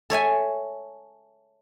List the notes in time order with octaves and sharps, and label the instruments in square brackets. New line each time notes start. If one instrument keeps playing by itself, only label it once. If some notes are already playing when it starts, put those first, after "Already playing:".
[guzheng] A4 C#5 E5 G#5